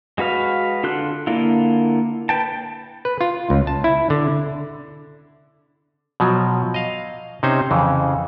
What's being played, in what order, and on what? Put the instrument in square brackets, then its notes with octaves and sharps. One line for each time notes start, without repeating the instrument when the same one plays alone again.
[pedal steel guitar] G#3 F#4 B4 F5
D3 F4 A4 C6 F#6
D3 A#3 E4 F4
B4 G5 A5
[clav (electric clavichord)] B4
F4
C#2
A5
E4
D3
B2 F3 F#3
D#5 F5
C3 C#4 D#4 C5
F2 C#3 E3